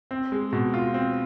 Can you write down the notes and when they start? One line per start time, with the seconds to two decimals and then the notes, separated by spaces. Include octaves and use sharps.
0.11 C4
0.32 G#3
0.53 B2
0.74 F4
0.94 C4